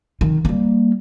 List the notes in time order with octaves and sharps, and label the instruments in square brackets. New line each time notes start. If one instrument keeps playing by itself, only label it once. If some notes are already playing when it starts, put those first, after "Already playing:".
[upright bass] D#3
G3 A#3